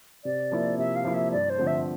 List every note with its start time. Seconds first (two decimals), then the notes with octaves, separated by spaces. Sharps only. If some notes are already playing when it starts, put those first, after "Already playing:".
0.24 C3 D5
0.52 F3 A#3 E4
0.78 C3 E5
0.96 F5
1.04 F3 A#3 E4
1.14 E5
1.32 G2 D5
1.50 C5
1.58 D3 F3 A3 C4
1.67 E5